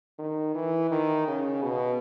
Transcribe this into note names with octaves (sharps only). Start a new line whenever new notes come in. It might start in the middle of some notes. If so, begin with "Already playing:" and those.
D#3
E3
D#3
C#3
B2